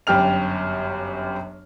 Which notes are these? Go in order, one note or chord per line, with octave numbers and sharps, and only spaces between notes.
G1 F#2 G3 G4 F6 F7